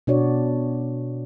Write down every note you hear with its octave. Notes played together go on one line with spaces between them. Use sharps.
B2 D4 F#4 C#5 D5